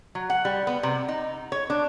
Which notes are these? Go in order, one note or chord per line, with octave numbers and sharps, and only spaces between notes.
F#3
F#5
G3
B3
C3
D#4
C#5
D4